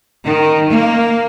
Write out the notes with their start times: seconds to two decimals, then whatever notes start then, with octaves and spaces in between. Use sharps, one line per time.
0.24 D#3
0.71 A#3